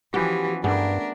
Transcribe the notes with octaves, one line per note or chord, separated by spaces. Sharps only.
E3 F3 B3 C#4 F#4 G4
G2 A3 B3 D4 G#4 A#4